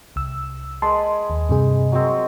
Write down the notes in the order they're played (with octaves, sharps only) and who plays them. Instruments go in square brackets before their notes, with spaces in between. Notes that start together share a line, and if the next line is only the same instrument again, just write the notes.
[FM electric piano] C2 E6
[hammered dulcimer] G#3 B4 [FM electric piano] A5 C6
[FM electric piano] D#2
G2 C3 G#4
[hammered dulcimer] F#3 G#3 C4